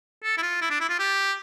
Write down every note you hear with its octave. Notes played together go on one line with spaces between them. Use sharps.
A4
E4
F4
E4
D4
E4
F4
G4